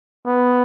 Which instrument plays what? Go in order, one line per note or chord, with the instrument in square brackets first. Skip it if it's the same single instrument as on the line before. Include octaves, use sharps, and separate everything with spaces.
[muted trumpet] B3